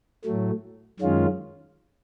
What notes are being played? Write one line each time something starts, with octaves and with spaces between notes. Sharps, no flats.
A2 F#3 A3
F#2 D#3 G#3 C#4 F4